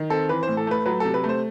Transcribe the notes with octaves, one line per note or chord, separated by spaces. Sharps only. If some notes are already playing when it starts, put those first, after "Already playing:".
Already playing: D#3
C4 A4
E3 B4
A2 C5
A4
A3 B4
F#3 B4
C3 A4
B4
A3
C5